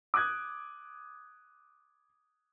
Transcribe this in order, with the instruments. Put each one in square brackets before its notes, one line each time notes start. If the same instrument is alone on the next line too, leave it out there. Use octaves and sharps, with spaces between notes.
[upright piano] D6 D#6 F#6 G#6